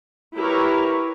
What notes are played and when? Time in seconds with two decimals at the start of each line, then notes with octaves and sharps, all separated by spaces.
0.36 E4 G4 A#4 B4 C#5